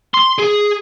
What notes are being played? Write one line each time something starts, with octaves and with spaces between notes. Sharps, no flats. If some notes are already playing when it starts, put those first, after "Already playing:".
C6
G#4